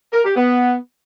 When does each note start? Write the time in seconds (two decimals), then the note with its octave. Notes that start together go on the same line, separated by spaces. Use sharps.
0.13 A#4
0.24 G4
0.36 B3